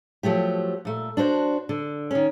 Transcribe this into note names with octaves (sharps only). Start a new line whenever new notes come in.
F3 F#3 A3 G4
A#2 A3
D4 F#4 C5
D3
D#3 C#4